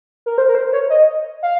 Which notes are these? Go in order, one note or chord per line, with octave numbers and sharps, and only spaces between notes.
A#4
C5
A#4
C5
C#5
D#5
F5